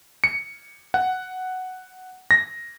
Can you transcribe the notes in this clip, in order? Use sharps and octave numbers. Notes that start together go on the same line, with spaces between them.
C#7
F#5
A#6